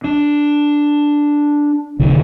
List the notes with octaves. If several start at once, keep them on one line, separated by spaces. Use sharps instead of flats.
D4
F1 C2 D3 D#3